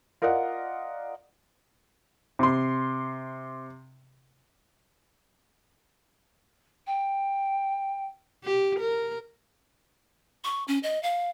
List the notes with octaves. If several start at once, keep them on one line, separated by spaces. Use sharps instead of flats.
F4 A#4 D5 D#5 F#5
C3 C6
G5
G4
A#4
C#6
C#4
D#5
F5